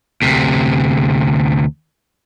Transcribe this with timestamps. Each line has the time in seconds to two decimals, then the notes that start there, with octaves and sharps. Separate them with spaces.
0.22 D2 C3